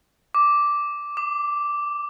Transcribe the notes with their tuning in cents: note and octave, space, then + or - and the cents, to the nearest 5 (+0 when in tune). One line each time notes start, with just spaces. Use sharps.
D6 -5
D6 +30